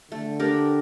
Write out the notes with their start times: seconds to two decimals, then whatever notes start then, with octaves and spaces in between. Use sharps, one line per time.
0.11 D3 A3
0.40 D4 G4 A#4